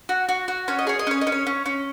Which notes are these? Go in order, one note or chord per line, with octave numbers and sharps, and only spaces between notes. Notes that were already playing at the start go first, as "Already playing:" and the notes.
F#4
F#4
F#4
C#4 C#5
D#5
G#4 C#5
D#5
C#4 C#5
D#5
C#4
C#5
C#4
C#4